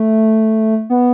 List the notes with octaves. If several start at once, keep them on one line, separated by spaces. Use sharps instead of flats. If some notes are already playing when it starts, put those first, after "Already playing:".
Already playing: A3
B3